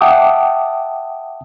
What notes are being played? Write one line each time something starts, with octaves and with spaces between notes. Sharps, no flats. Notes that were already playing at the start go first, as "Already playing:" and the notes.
E5 F#5 G5 A5 D6 D#6